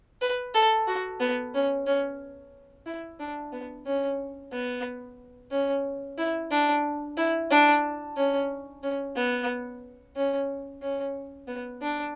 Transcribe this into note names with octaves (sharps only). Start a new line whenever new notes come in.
B4
A4
F#4
B3
C#4
C#4
E4
D4
B3
C#4
B3
C#4
E4
D4
E4
D4
C#4
C#4
B3
C#4
C#4
B3
D4